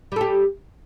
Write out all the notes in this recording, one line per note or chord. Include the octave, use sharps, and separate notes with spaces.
G3 G4 A4